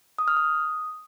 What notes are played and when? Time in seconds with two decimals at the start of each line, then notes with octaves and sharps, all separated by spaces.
0.18 D#6
0.28 F6
0.37 D#6